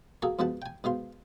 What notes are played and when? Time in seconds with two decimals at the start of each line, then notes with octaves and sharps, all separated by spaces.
0.22 A#3 F#4 G#4 A4
0.39 F2 G#2 B2 F#5 A5
0.62 G5 G#5
0.84 G#2 B2 F5 C6